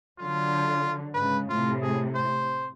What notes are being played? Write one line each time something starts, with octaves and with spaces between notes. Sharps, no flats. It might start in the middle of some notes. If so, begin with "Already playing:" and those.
D3 F#3 F4
G#2 C#3 B4
A2 C3 F4
G#4
C5